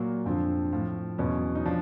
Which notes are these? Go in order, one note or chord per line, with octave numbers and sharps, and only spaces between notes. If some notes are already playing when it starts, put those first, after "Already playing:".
Already playing: A#2 F#3 A#3
F2 D3 F3 C4
A2 F3
E2 B2 F#3 C#4
D#4
F3 D4